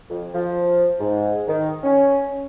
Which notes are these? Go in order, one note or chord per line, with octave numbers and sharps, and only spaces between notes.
F2
F3
G#2
D#3
C#4